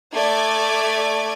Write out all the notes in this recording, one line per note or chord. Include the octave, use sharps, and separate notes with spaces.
A3 D5 D6 G#6